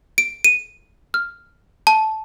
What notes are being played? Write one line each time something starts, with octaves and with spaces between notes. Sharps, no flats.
D7
D#7
F6
A5